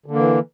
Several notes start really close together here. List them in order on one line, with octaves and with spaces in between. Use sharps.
D3 A#3 E3